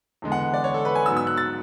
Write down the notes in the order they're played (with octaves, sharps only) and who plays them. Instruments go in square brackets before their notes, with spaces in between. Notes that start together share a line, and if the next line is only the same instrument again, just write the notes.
[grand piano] E2 D3 G#3 B3
F#5
D5
C#5
A4
B4
G#5
G#2 F#3 B3 E6
E6
F#6
A6